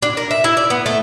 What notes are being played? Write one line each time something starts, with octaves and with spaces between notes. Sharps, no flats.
D4
A#4
E5
E4
D5
B3
A3